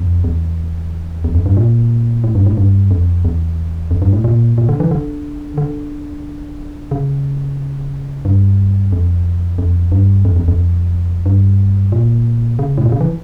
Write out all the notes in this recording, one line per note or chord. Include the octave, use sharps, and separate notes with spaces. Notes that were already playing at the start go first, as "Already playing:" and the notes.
Already playing: F2
E2
E2
F2
G2
A#2
A2
G2
A2
G2
F2
E2
F2
G2
A2
A#2
A#2
D3
E3
D3
D3
C#3
G2
F2
F2
G2
F2
E2
F2
G2
A#2
C#3
A2
A#2
C#3
E3